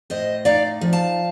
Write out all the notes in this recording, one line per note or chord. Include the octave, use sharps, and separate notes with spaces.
A2 C5 D#5
D#4 D5 F5
F3
F5 A5